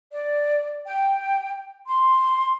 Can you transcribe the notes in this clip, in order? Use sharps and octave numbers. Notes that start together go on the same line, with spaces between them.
D5
G5
C6